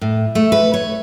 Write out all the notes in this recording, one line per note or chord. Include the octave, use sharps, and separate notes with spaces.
A2
A3
B4
C#5